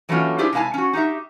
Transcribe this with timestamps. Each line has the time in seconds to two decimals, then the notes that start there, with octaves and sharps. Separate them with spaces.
0.09 E3 F#3 A3 A#3 C#4 F4
0.38 D4 E4 F4 G4 G#4 C5
0.53 C3 G#3 E4 F5 G#5 A5
0.74 C#4 F#4
0.93 D#4 G4 E5